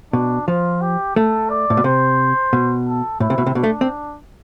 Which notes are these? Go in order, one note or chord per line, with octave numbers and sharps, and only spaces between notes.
B2 D4
F3 F4
G4
A3 A4
D5
A2
B2
C3 C5
B2
A4
A2 E4
C3
B2
C3
B2 D4
A3
C4